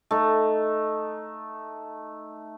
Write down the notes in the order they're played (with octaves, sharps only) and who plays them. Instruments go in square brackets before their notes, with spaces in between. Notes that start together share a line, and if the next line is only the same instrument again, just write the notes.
[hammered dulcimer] A3 D#4